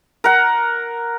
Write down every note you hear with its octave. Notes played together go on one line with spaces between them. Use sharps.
A#4 F#5